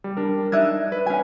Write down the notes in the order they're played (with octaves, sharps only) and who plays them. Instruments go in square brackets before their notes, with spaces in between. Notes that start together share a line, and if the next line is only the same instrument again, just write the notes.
[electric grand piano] G3
G3 D4 A#4
[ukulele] D4 D#4 E5 [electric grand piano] F#6 G#6
[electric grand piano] B4
[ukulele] C#4 G#5